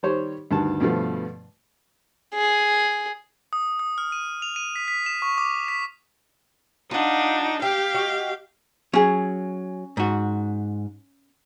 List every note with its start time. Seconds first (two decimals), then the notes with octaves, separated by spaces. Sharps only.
0.03 D#3 G3 G4 C5 C#5
0.51 D2 G2 D#3 A5
0.80 G2 B2 D3 F3 A3
2.35 G#4
3.53 D#6
3.79 D#6
3.98 F6
4.12 D#7
4.42 F7
4.56 D#7
4.76 B6
4.88 B6
5.06 E7
5.22 C#6
5.38 D6
5.68 B6
6.91 D4 D#4 F4 F#5
7.62 G4 F5 G5
7.94 F#4 D#5 G5
8.93 F#3 C#4 G#4
9.97 G#2 F#4